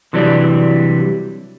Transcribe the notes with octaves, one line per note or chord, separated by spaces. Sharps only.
C3 E3 F#3 G3 D4